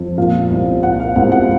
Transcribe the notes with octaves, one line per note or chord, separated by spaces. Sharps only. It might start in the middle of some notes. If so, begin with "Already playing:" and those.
Already playing: F2
A#2 F5
C2
A#2 F#5
F5
C2 F#5
F#5